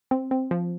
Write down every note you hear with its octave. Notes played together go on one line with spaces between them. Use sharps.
C4
C4
F3